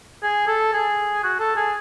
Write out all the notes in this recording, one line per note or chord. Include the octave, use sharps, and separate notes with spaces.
G#4
A4
G#4
F#4
A4
G#4